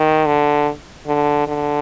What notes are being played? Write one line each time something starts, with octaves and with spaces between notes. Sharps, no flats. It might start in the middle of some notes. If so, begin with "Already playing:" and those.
Already playing: D#3
D3
D3
D3